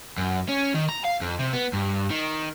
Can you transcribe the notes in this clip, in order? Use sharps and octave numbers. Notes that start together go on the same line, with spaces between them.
F#2
C#4
D#3
A#5
F5
F2
C3
B3
G2
D#3